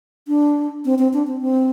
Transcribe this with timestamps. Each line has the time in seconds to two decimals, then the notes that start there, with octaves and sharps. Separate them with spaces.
0.28 D4
0.85 C4
0.99 C4
1.13 D4
1.27 C4
1.41 C4